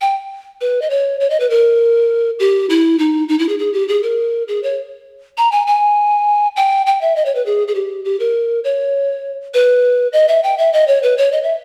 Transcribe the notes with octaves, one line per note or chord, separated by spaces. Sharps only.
G5
B4
D#5
C#5
C#5
D#5
B4
A#4
G4
E4
D#4
D#4
E4
G#4
G#4
G4
G#4
A#4
G#4
C#5
A#5
G#5
G#5
G5
G5
E5
D#5
C#5
B4
G#4
G#4
G4
G4
A#4
C#5
B4
D#5
E5
G5
E5
D#5
C#5
B4
C#5
D#5
E5